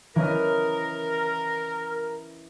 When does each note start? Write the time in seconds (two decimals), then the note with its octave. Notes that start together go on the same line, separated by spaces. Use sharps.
0.16 E3 C#4 A#4 D#5